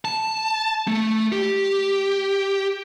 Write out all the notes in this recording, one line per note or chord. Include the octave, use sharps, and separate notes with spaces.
A5
A3
G4